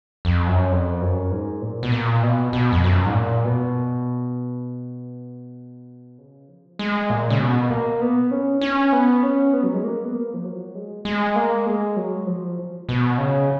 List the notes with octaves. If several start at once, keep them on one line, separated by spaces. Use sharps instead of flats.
F2
F#2
F2
F#2
G#2
A#2
B2
A#2
B2
B2
F2
F#2
G#2
A#2
B2
C#3
F3
G#3
A#2
C#3
B2
A#3
B3
C#4
C#4
B3
C#4
B3
F#3
G#3
A#3
B3
A#3
F3
F#3
G#3
G#3
A#3
G#3
F#3
F3
B2
C#3